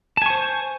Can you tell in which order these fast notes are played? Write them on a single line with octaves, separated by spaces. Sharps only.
A5 G#5 C#6 C5